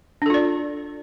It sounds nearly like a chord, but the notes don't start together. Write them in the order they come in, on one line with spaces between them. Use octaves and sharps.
D4 A4 F4 D5